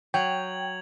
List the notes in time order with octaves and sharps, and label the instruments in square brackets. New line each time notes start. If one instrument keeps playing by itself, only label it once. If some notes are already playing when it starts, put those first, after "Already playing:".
[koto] F#3 [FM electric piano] G5 [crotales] G#6 F7 F#7